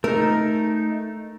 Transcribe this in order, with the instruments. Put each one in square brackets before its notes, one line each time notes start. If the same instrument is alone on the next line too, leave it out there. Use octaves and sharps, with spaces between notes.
[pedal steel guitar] A3 D#4 [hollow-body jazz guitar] A#4